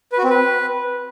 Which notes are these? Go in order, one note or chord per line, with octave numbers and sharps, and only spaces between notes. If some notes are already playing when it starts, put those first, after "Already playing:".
B4
F#4
C4
B4